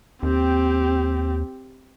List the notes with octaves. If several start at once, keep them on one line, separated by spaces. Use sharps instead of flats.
D#2 C4 G4